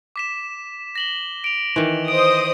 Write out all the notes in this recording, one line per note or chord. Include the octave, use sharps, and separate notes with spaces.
D6 B6 E7
A#6 F#7 G7
D7 F7
D#3 E3
C5 D#5 D#6 D7